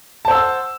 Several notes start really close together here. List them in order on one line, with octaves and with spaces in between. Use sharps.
A5 C5 E6 F#5